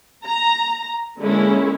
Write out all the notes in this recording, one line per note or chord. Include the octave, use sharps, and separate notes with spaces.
A#5
D3 G#3 A#3 C#4 E4